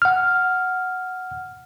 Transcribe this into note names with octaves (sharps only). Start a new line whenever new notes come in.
F#5 F6